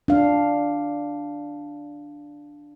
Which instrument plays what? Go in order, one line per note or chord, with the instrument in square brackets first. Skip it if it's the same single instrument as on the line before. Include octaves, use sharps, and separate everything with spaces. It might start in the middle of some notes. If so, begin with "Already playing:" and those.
[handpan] D4 F5